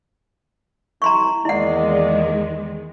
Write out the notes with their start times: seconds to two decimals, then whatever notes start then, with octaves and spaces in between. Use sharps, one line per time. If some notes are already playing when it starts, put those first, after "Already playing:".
1.02 C2 E4 A#5 C6 C#6
1.45 E2 D#3 G#3 A#3 E4 D5 D#5 F#5